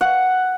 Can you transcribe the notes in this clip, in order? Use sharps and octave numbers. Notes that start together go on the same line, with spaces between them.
F#5